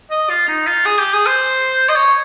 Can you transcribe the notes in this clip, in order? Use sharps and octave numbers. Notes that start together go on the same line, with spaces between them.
D#5
F4
D#4
F4
G#4
G4
G#4
C5
D#5
C#5